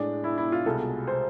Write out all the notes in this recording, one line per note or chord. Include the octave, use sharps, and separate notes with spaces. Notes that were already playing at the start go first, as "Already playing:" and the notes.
Already playing: A2 G#3 D4
E4
E4
F4
C2 B2 G#3 A4
C5